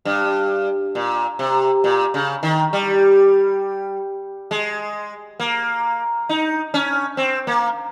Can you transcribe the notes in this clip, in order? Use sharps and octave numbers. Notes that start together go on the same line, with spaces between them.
G2
A#2
C3
A#2
C#3
D#3
G3
G#3
A#3
D#4
C#4
C4
A#3